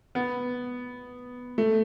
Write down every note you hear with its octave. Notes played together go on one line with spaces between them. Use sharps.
B3
A3